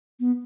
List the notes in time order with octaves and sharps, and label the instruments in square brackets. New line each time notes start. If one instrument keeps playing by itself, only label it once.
[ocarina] B3